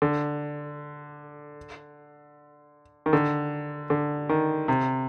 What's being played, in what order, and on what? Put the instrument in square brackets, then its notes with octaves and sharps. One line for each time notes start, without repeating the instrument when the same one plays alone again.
[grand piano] D3
D#3
D3
D3
D#3
C3